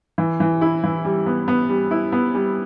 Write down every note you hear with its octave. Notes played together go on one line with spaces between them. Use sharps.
E3
E3
E4
E3
G3
B3
B3
G3
E4
B3
G3